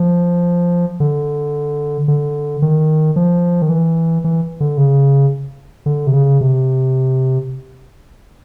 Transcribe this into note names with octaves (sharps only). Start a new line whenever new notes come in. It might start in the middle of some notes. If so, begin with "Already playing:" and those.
Already playing: F3
D3
D3
D#3
F3
D#3
E3
E3
D3
C#3
D3
C3
C#3
C3